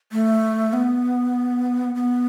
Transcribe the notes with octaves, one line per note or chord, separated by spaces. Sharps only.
A3
B3
B3